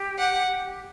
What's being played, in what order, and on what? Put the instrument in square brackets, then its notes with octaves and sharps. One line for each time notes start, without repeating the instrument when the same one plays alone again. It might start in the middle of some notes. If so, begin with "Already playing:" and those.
Already playing: [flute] G4
[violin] F#5